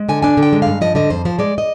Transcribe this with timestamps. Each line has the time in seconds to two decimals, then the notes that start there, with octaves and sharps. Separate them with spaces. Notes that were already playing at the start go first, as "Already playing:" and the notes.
Already playing: G#3
0.09 D3 G#5
0.22 D4 G#5
0.37 D3
0.42 G5
0.53 G#3
0.62 G2 F5
0.81 F3 D#5
0.95 D3 D#5
1.10 F2 C5
1.25 F3 C5
1.39 G#3 D5
1.58 D#5